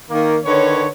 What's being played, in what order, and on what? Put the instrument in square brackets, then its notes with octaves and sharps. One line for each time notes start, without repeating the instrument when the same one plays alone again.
[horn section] D#3 A#3
D3 D#3 B4 C#5